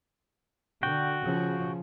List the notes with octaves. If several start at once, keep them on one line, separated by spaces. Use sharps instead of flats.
D3 F#4 G5
C#3 F3